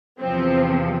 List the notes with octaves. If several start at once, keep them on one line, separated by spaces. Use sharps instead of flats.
E2 C3 F3 C4